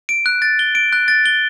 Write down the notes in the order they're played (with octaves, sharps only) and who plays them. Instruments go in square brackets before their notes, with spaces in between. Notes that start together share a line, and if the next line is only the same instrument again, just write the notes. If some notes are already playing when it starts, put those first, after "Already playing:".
[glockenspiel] D7
F#6
A6
G7
D7
F#6
A6
G7